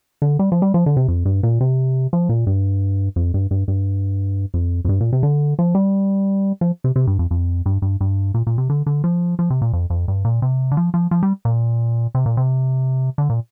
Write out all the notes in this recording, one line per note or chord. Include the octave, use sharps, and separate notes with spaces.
D3
G3
F3
G3
F3
D3
C3
F2
G2
A#2
C3
F3
A#2
G2
F2
G2
G2
G2
F2
F2
G2
A#2
C3
D3
F3
G3
F3
C3
C3
G2
F2
F2
G2
G2
G2
A#2
A#2
C3
D3
D3
F3
F3
C3
A#2
F2
F2
G2
A#2
C3
D3
F3
F3
F3
G3
A#2
C3
A#2
C3
D3
A#2